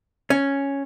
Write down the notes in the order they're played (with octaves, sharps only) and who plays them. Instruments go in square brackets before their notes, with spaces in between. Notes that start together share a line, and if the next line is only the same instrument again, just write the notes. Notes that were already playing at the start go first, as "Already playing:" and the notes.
[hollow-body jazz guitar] C#4